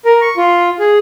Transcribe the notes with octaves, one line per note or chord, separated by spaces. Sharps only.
A#4
C#6
F4
G#4